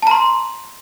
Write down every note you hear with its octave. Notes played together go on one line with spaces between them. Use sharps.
A5 A#5 C6